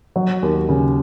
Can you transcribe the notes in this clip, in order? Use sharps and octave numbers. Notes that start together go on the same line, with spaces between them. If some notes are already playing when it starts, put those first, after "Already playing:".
F#3
D#2
C#3